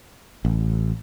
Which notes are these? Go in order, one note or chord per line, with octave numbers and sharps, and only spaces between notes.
A1